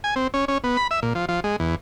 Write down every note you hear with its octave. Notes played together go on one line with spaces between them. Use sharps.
G#5
C4
C#4
C#4
B3
B5
E5
A#2
F3
F3
G#3
E2